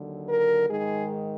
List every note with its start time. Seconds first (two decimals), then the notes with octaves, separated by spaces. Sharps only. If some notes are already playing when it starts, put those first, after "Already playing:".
Already playing: D#2 D3 F#3
0.28 A#4
0.69 G#2 D#3 G#3 G#4